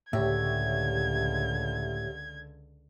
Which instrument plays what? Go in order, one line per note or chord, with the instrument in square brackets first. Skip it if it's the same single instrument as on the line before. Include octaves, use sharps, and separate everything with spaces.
[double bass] C#2 D3 [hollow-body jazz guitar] A2 [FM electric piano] G4 C#5 E5 [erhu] G#6